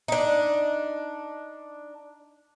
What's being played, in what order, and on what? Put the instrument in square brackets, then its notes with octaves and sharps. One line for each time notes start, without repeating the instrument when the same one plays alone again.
[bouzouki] D4 D#4